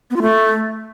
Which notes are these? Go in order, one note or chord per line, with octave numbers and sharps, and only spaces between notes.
B3
F4
A3